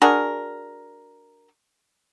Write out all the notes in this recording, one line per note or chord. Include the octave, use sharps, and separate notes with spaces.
D4 F#4 G#4 A#4